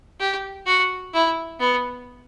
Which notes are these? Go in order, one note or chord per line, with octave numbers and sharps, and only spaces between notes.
G4
F#4
E4
B3